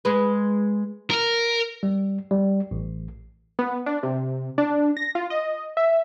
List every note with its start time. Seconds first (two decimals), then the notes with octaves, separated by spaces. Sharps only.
0.05 G#3 B4
1.10 A#4
1.83 G3
2.31 G3
2.71 A1
3.59 B3
3.86 D4
4.03 C3
4.58 D4
4.97 A#6
5.15 F4
5.30 D#5
5.77 E5